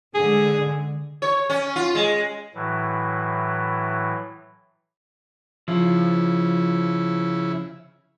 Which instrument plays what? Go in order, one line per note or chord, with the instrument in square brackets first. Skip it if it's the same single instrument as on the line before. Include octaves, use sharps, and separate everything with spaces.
[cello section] D3 G#3 [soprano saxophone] G#4
[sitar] C#5
C#4
F4
G#3
[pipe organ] A2 E3 F#3
[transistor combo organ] C#3 E4 [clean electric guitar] F3